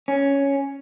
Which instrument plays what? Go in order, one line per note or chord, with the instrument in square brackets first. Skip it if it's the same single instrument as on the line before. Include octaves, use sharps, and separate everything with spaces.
[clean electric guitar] C#4